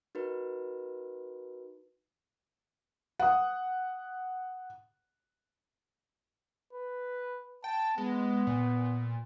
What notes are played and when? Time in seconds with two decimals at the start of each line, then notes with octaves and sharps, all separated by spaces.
0.15 D#4 F#4 A#4 B4
3.19 F#5 D#6
6.73 B4
7.64 G5 A5
7.98 G#3 B3
8.47 A#2